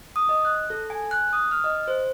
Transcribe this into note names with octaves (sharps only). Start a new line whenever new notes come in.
D#6
D#5
F#6
A4
G#5
F#6
D#6
F6
D#5
C5